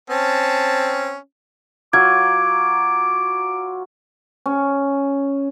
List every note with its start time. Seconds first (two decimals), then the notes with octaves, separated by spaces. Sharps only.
0.10 C4 C#4 A5
1.93 F#3 F4 D6 G#6
4.46 C#4